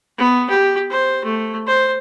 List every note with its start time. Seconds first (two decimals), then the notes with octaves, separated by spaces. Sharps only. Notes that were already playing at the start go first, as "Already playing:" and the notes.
0.18 B3
0.49 G4
0.91 C5
1.24 A3
1.67 C5